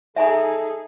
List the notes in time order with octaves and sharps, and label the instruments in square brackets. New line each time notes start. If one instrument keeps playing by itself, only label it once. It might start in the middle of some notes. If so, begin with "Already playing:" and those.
[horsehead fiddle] D#4 G#4 [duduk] A4 [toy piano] E5 G#5 A#5